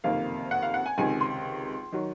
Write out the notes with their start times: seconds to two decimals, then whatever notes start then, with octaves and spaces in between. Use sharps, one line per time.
0.04 F#1 F2 C3 D#3 A#3 F5
0.51 F#5
0.62 F5
0.74 F#5
0.86 G#5
0.97 C#2 C3 D#3 G#5
1.21 C6
1.92 D#3 F#3